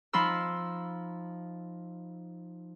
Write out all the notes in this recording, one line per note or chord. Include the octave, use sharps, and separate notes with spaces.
F3 D#4 B5 C6 E6